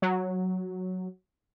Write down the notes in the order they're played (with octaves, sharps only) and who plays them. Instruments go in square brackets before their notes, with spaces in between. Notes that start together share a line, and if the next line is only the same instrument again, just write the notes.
[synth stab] F#3